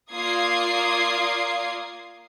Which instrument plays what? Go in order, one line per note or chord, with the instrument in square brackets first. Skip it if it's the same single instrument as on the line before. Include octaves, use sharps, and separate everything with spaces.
[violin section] A#3 F4 D5 D#6 G#6 C7